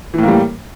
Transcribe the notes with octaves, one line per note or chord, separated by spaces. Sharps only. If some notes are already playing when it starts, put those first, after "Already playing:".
A2 E3 G3 A#3